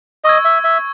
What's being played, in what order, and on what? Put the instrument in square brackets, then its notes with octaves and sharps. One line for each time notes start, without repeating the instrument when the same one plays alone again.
[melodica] D#5 [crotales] C#6 E6 G#6
[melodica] E5
E5